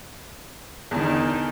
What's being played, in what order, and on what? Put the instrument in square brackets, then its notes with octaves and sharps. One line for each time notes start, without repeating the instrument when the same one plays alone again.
[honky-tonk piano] E2 [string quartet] D3 D#3